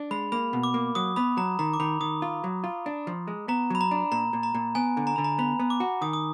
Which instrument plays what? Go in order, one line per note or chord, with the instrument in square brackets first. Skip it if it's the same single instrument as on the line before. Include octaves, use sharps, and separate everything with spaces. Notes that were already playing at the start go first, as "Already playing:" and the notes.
Already playing: [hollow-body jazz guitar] D4
[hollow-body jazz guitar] G#3 [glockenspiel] B5
[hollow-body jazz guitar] A#3 [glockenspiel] B5
[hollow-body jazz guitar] B2
[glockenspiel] D6
[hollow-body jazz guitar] A#3
[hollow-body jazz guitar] F#3 [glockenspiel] D#6
[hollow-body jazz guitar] B3 [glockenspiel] B5
[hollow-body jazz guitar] F#3 [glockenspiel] A#5
[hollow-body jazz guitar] D#3 [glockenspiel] A#5
[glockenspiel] D6
[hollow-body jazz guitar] D#3 [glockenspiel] B5
[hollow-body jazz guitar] D#3 [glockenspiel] D#6
[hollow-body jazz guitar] F4
F#3
F4
D4
F3
G#3
[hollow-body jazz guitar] B3 [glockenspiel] A#5
[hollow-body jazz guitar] F#3 [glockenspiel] B5
[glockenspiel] A#5
[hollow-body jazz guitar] D4
[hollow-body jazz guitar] A#2 [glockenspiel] A#5
[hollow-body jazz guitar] A#2
[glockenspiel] A#5
[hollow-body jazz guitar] A#2
[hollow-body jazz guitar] B3 [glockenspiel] G#5
[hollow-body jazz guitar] D3
[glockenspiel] A#5
[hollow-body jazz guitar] D3 [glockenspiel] B5
[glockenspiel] A#5
[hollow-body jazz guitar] B3 [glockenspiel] B5
[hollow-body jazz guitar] B3
[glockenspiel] D6
[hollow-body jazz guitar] F#4
[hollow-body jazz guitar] D#3 [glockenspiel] D#6
[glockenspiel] D#6